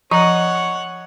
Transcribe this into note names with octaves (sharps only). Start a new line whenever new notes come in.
F3 C#5 D#5 F#5 A#5 C#6